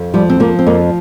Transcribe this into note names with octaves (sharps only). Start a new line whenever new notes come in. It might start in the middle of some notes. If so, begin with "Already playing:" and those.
Already playing: F2
F3 G3
C4
F3 A#3
C4
F2 A#3